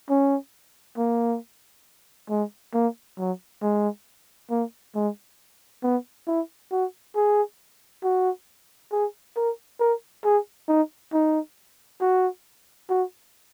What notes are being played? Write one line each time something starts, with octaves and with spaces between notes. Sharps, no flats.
C#4
A#3
G#3
A#3
F#3
G#3
A#3
G#3
B3
E4
F#4
G#4
F#4
G#4
A#4
A#4
G#4
D#4
D#4
F#4
F#4